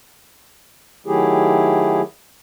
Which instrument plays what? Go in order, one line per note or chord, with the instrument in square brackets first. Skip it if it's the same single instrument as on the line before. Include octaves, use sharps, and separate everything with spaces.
[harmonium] D#3 F#3 A3 E4 G4 G#4